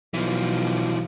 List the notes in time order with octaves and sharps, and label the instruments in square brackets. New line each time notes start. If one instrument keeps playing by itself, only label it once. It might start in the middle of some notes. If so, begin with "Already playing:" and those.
[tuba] B1 [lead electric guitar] E3 F3